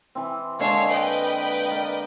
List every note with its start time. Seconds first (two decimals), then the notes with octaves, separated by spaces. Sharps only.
0.15 E3 C4
0.59 D3 G#3 A#3 C#5 A5 C7
0.88 B4 D#5 G5
1.71 A#4 D5